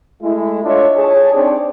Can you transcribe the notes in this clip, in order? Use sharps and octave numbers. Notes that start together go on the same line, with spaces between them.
G#3 A3 E4
D4 F4 A4 C#5 D#5 E5
G#4 C#5 A5
C4 D4 D#4 G#4 C#5 D5